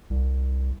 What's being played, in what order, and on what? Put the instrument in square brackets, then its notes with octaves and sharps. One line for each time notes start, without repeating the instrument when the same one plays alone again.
[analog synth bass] C2